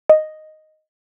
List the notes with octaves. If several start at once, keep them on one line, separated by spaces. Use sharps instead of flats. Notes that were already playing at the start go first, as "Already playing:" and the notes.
D#5